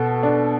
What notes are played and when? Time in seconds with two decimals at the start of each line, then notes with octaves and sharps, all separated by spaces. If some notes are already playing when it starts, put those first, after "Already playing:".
Already playing: B2 A4
0.23 D4